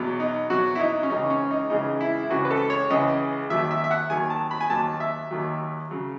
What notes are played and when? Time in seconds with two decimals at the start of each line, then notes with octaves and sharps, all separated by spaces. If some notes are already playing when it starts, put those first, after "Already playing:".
Already playing: E2 B2 F#3
0.20 D#4
0.50 E2 B2 F#3 F#4
0.75 E4
0.80 D#4
1.03 C#4
1.10 C#2 C#3 E3 G#3 D#4
1.30 C#4
1.51 D#4
1.70 C#2 C#3 E3 G#3 D#4
2.01 E4
2.23 E4
2.30 C#2 C#3 E3 G#3 F#4
2.45 B4
2.51 A4
2.70 C#5
2.90 C#2 C#3 E3 G#3 D#5
3.50 D#2 D#3 F#3 E5
3.71 E5
3.84 E5
3.91 F#5
4.10 D#2 D#3 F#3 G#5
4.30 A5
4.51 B5
4.61 G#5
4.70 D#2 D#3 F#3 A5
5.00 E5
5.31 D#2 D#3 F#3
5.91 C#3 F#3